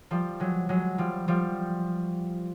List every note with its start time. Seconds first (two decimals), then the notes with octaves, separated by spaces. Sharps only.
0.11 F3 G3
0.40 F#3 G#3
0.69 F#3 G#3
0.98 F3 G3
1.28 F3 G3